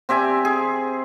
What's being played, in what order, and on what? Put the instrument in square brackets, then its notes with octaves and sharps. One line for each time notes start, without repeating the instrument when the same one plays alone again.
[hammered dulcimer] C4 G4 E5 G#5
G#4